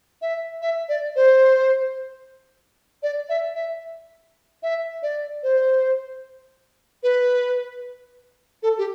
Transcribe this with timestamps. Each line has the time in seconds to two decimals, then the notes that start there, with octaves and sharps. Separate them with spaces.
0.22 E5
0.62 E5
0.89 D5
1.16 C5
3.03 D5
3.29 E5
3.55 E5
4.63 E5
5.03 D5
5.43 C5
7.03 B4
8.63 A4
8.78 G4